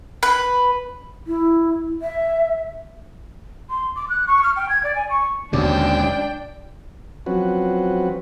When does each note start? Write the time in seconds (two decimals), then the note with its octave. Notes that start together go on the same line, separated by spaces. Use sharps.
0.23 B4
1.27 E4
2.02 E5
3.70 C6
3.96 D6
4.10 F#6
4.28 C#6
4.43 F6
4.56 G5
4.69 G#6
4.84 D5
4.95 G#5
5.10 C#6
5.53 D#2 G#2 B2 D3 C#4 D4 D5 G5
7.26 F3 F#3 C4 C#4 F#4 B4